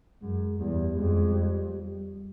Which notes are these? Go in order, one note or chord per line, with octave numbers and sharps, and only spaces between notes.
F#2 G#3
E2 G3
F2 G#3
G3
G3